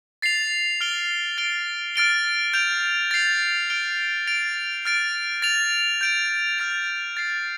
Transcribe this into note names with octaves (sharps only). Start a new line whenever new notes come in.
A6 C7 F7
F6 D7 G7
A6 D7 G7
F6 A6 D7 G7
G6 D7 F7
A6 C7 F7
F6 D7 G7
A6 D7 F7
F6 A6 D7
A6 F7
G6 D7 F7
F6 A6 F7
A6 C7 F7